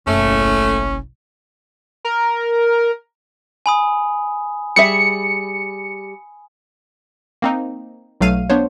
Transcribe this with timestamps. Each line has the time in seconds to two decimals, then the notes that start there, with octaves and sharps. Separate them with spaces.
0.07 F#1 B1 A3 C#4
2.05 A#4
3.66 G#5 B5 D#6
4.76 G3 G#4 E5 C#7
7.42 A#3 C4 D#4
8.21 B1 F#3 A3 F5 F6 D#7
8.50 B3 D4 C5 C#5